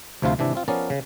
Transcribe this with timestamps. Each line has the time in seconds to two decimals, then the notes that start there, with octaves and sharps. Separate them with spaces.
0.22 D2 C3 F3 E4 F4 C5
0.38 G#1 C3 E3 D4 E4
0.55 C4 F4
0.68 F3 B3 C#4 A#4 D5 F5
0.90 C#3